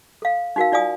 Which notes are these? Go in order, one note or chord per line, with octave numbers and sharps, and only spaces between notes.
A4 F5
D#4 F#4 A#4 F5
D#4 F4 D5 F5 G#5 D#6